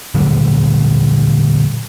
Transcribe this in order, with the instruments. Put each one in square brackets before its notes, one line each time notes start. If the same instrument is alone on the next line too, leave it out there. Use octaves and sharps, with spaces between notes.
[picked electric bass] A#2 D3 F#3 G3